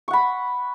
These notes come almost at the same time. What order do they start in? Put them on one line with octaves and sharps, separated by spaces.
C#6 F#5 B5